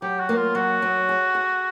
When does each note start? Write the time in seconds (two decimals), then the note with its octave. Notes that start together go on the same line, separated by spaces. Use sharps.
0.02 F#3 G4
0.20 F#4
0.29 A#3
0.37 F4
0.55 F#3 F#4
0.82 F#3
1.09 G#4
1.35 G#4